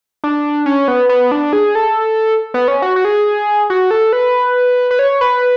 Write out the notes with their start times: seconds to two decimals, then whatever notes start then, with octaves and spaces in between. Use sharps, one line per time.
0.24 D4
0.66 C#4
0.88 B3
1.09 B3
1.31 D4
1.53 G#4
1.75 A4
2.54 B3
2.68 C#4
2.82 F#4
2.96 F#4
3.05 G#4
3.70 F#4
3.91 A4
4.13 B4
4.91 B4
4.99 C#5
5.21 B4